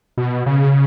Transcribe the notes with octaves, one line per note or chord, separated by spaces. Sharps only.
B2
C#3